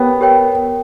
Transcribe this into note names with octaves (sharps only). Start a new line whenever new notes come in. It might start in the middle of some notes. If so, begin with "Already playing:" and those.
Already playing: B3 G4 A#4 C#5 G5
G4 A#4 C#5 G5